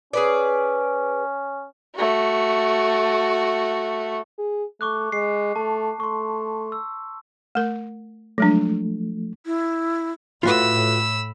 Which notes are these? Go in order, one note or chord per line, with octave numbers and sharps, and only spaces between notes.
C#4 G#4 B4 D5
A3 F#4
G#4
A3 C#6 D6 F#6
G#3 C7
A3 A5
A3 C6 C#6
E6
A3 A#4
F3 F#3 G#3 A3 D4
E4
A2 F4 F#4 B4 B5 E6